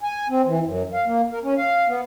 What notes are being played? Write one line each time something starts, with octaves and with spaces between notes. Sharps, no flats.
G#5
C4
E3
F#2
F5
A#3
A#4
C#4
F5
B3